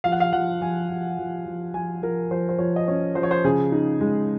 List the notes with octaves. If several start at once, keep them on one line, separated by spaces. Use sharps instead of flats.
F3 F5
F#5
F5
F3 F#5
F3 G#5
F3
F3
F3
F3 G#5
F3 A#4
F3 C5
C5
F3 C#5
D#5
C#4 C#5
F3 C5
C#5
C5
C#3 G#4
D#4
G#3